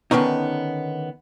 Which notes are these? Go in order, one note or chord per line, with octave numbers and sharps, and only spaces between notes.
D3 D#3 B3 C#4 D#4